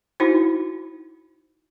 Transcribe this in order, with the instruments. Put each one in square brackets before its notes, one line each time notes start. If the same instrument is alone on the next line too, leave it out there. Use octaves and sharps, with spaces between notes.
[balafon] D#4 E4 F#4 C5